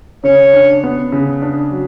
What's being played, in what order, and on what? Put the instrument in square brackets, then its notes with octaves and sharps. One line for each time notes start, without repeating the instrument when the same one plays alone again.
[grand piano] C#3 [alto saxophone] C#5
[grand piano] D4
B3
C#3
D4
F#3